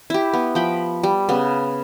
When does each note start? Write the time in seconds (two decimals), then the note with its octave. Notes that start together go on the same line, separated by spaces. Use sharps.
0.10 E4 G4
0.33 B3
0.55 F3 G5 B5
1.03 G3
1.29 C#3 B3